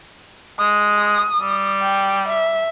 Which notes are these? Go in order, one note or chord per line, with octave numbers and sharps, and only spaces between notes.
G#3 D#6
G3
G5
E5